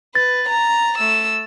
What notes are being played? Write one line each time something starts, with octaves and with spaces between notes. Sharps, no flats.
B4 A6
A#5
A3 E6